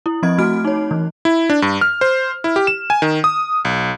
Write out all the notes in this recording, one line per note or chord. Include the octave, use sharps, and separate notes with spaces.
E4
F3 C4 D#5 G#6
A3 C4 F#4 F6 D7
D#4 C#5
E3
E4
D4
G2
F6
C5
E4
G4
E7
G#5
D#3
D#6
B1